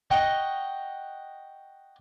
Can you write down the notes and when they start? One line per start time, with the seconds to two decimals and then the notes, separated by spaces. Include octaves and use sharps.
0.10 D#5 F#5 G5 A#5 C#6